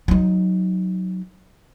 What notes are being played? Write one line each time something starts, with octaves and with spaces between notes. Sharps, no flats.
F#3 D#4